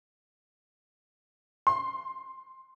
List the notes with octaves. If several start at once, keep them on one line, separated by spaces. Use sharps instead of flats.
C6